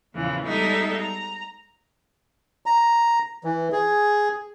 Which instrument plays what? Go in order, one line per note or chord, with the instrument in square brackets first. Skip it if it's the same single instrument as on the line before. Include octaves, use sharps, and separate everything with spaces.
[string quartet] E2 A#2 C#3 E3 F3
G3 G#3 B3 D#4 A4 E5
A#5
[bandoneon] A#5
E3
G#4